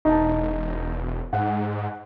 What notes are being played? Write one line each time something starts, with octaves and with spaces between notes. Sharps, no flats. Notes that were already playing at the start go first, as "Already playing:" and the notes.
E1 D#4 A5
G#2 F#5